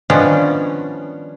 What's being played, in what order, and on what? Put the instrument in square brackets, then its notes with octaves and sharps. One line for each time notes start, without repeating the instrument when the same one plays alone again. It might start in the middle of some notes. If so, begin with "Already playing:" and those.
[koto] D#3 F3 G3 B3 C#4 D4